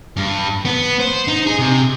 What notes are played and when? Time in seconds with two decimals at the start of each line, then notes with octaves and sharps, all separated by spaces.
0.17 G2
0.65 B3
1.00 C5
1.27 D#4
1.46 G#4
1.59 C3